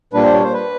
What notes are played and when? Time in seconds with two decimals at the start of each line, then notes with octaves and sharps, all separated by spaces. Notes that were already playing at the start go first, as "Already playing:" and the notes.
0.13 A#2 G3 A#3 D4 B4
0.24 C5
0.34 C#5
0.44 C5
0.54 B4